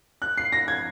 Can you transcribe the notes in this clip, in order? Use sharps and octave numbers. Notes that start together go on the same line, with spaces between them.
F#6
C7
A#6
G#6